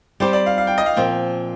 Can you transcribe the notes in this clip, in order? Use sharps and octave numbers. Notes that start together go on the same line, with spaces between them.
G3 C4 G4 C5
D5
F5
F5
G5
D#5
F5
A#2 F3 C4 G5